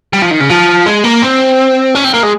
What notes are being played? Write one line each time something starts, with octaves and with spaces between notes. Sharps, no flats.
G3
F3
D#3
C#3
F3
G#3
A#3
C4
C#4
C4
A#3
G#3